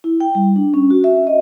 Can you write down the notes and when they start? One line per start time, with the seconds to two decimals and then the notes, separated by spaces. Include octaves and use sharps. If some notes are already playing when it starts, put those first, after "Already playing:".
0.04 E4
0.20 G5
0.35 G3
0.56 D4
0.74 C#4
0.90 F#4
1.04 E5
1.27 D#5